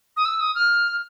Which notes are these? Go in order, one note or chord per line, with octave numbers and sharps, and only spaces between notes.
D#6
E6
D#6
F6